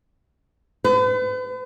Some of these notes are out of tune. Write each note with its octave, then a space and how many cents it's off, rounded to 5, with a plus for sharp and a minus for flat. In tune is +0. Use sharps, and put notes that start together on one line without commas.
B4 +45